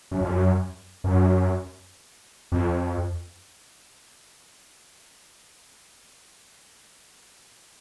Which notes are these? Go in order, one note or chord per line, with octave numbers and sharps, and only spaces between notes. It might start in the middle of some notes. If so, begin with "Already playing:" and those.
F#2
F2
F#2
F#2
F2